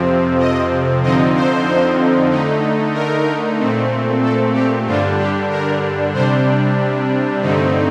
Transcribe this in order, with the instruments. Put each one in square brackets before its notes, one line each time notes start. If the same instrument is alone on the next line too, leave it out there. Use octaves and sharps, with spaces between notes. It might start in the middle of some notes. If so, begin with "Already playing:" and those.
Already playing: [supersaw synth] F2 C3 F3 C4
D#5
F2 D3 F3 C4 D#4 D#5
C5
D3 A3 D#4
A#4
A#2 A3 C4
A4
G4
G2 D3 G3 D4 F4
G4
A#4
C3 G3 D4 C5
G2 D3 A3 C4 D#4